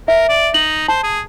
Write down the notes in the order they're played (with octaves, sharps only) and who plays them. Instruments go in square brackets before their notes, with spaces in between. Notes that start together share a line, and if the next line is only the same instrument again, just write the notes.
[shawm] A#4 [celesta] E5
[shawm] D5
[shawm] D#4 [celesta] F#7
[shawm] C5 [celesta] A5
[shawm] G#4